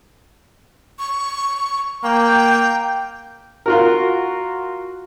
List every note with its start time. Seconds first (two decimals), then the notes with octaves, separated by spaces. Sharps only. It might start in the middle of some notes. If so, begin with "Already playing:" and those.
0.99 C#6
2.04 A#3 G5
3.66 F4 F#4 A#4